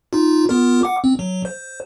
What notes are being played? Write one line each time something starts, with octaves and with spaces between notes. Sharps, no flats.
D#4 F4
B3 F4 A#4
F#5 D6
C4
F#3
C5